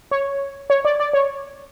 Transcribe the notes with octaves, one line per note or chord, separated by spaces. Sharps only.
C#5
C#5
D5
D5
C#5